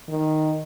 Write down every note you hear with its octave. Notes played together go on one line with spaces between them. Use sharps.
D#3